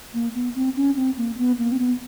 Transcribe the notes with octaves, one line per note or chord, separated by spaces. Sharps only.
A#3
B3
C4
C#4
C4
A#3
B3
A#3
C4
B3